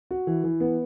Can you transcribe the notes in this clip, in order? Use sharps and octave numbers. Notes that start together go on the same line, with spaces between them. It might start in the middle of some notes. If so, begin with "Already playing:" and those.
F#4
E3
E3
B3